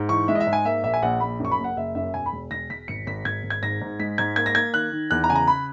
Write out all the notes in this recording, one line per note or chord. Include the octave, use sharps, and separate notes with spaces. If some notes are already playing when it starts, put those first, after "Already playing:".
Already playing: G#2
E3 C#6
G#3 E5
D#5
E5
G#2
G#5
A#3 E5
A#1 E5
G#5
A#1 F#5
A#1 B5
F#2 C#6
B5
F#1
F#5
F#1 E5
F#2 E5
E1 G#5
B5
E1
E1 A#6
E1 B6
G#1 C#7
G#1 B6
G#1 G#6
G#1
G#6
G#2 A#6
G#2
G#3 B6
G#2 G#6
A#3 G#6
A#6
A#3 G#6
D#3 F#6
D#3
E2 F#6
A#5
C#3 G#5
A#5
B5